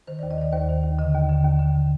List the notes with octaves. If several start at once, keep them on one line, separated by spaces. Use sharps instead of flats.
D#3 C5
D#2 D5
D#5
D#3 D5
D#2 C5
D#3
D#2
D3 D#5
D#2
D3
D#2
D3